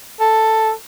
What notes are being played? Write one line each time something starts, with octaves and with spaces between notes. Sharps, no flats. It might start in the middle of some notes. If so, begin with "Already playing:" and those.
A4